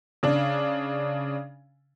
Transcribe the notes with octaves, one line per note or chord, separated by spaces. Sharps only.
C#3 D4